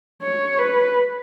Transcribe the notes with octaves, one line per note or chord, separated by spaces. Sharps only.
C#5
B4